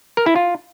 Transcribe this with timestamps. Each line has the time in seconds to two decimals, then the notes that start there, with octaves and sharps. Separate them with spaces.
0.17 A#4
0.26 E4
0.36 F4